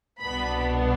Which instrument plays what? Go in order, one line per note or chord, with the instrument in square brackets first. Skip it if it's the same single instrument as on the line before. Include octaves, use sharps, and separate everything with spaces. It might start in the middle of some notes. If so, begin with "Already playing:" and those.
[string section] C2 B2 B3 D4 B5